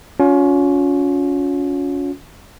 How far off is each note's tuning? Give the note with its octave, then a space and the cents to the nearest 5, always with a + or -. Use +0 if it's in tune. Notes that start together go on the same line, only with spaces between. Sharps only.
C#4 +25 F4 +45